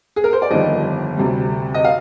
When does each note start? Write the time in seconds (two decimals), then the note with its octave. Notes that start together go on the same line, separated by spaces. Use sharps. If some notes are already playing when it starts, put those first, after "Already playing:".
0.16 G#4
0.24 A#4
0.33 C5
0.42 D5
0.51 G1 F2 D#3 G3 D#5
1.17 D2 C3 G3
1.74 D#5
1.85 F5